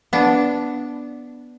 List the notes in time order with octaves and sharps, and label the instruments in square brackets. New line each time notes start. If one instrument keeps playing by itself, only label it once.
[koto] B3 D4